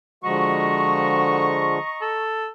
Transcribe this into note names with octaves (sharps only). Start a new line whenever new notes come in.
D3 F3 G#3 F#4 D#5 A#5 C#6
A4